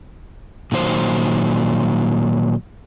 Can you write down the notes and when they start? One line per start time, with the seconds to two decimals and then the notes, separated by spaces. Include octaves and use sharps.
0.72 A#2 D#3 F#3 C5